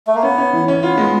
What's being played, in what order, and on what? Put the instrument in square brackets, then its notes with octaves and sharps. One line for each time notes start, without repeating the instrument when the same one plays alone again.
[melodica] A3
A#3
[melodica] B3 [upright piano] C#4
[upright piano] C#4
E3
C#4
[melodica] B3 [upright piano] F4
[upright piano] G#3